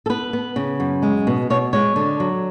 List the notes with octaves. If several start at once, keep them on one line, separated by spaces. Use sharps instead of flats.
A4
B3 B4
B3
C#3
F#2
G#3
B2
B2 C#5
G#3 C#5
D3
F#3